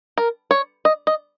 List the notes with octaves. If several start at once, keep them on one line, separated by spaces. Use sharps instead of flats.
A#4
C#5
D#5
D#5